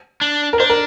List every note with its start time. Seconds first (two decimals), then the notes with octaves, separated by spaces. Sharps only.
0.21 D4
0.53 A#4
0.60 D4 C5
0.70 A#4